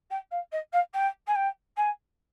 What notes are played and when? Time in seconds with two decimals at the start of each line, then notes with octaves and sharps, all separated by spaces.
0.10 G5
0.31 F5
0.52 D#5
0.73 F5
0.93 G5
1.27 G#5
1.35 G5
1.76 G#5